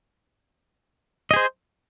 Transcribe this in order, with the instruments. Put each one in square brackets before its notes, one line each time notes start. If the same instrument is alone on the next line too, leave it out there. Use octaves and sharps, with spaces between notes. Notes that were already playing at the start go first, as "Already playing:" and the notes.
[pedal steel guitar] D#5
G#4
C5